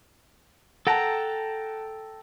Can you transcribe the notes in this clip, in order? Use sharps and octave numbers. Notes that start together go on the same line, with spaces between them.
A4 F#5 G5 A5 A#5